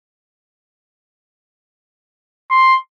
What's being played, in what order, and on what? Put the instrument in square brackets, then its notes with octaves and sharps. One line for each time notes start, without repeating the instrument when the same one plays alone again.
[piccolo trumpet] C6